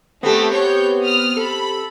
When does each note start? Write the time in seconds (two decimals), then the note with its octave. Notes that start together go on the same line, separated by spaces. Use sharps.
0.23 A3 B3 C4 G4
0.53 C#5 G6
1.02 D#6 F6
1.37 A4 B5